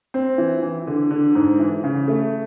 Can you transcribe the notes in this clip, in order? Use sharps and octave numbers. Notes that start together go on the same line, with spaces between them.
C4
E3
E3
D3
D3
G#2
E3
C#3
A3